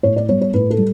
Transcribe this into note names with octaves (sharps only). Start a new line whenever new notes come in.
A2 C#5
D5
G3 B3 C#5
C#5
A2 B4
A4
G3